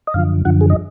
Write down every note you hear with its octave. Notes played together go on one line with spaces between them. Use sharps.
D#5
F#2 D3 F3 F5
F#2 D3 F3 F#5
G#4
D#5